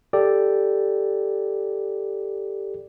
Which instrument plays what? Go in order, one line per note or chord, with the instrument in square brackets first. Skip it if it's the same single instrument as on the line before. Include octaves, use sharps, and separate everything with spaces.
[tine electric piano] G4 A4 D5